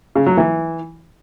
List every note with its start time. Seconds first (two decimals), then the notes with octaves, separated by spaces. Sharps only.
0.15 C#3
0.26 F#3
0.37 E3